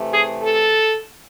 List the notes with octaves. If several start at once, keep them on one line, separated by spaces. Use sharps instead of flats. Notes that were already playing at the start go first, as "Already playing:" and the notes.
Already playing: C3 E3 A3
G#4
A4